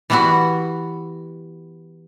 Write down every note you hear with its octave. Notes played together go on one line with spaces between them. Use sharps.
E3 G3 B3 E4 F#4